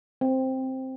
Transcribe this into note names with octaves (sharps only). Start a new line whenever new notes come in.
C4